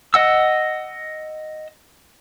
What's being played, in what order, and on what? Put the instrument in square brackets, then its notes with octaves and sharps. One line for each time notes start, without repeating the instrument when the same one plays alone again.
[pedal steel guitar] D#5 F#5 E6